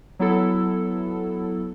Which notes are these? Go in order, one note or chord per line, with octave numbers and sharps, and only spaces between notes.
F#3 B3 E4 A4